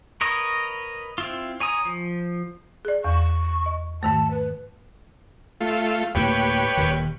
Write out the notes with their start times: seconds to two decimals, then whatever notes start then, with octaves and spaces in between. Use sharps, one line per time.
0.21 A#4 B4 C#5 D#5
1.18 C4 E4 F4
1.60 C#5 G#5 A#5 D#6
1.85 F3
2.85 G#4 D5
3.04 E2 C#6
3.66 D#5
4.03 G#2 D#3 A3 A5
4.31 B4
5.61 A3 F4
6.15 D2 A2 A#3 G4 B4 C#5
6.77 D#1 D#3